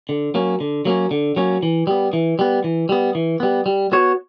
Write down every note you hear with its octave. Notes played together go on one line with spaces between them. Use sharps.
D3
F#3 A#3 C#4
D3
F#3 A#3 C#4
D3
F#3 A#3 C#4
E3
G3 B3
E3
G3 B3
E3
G3 B3
E3
G3 B3
G3
B3 F#4 C#5